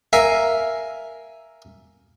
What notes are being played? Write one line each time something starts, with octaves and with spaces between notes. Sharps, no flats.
A#4 E5 F5 G#5